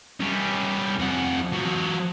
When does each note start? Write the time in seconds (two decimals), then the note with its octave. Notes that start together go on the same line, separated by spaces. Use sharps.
0.20 G3 C#4
0.99 F2 F#5
1.53 F#3 F4